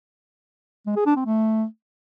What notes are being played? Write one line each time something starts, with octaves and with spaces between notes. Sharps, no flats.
G#3
G#4
D4
C4
A3